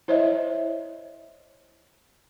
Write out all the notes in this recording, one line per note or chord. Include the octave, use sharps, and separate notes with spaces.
E4 C5 C#5 D#5 E5